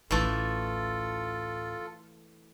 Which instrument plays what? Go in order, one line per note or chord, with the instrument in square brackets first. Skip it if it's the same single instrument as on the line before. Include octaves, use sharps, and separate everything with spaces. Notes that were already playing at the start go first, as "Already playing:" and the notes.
[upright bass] A1 D2 [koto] E3 A3 [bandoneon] F4 A4